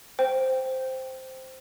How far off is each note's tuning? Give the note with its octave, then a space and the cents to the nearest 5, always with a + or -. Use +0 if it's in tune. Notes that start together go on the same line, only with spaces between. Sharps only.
C5 +0 G5 +0